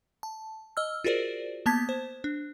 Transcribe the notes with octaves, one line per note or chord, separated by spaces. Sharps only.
A5
D#5 E6 F6
F4 F#4 G#4 A#4 C5 D5
A#3 B3 A5 G#6 B6
C5
D4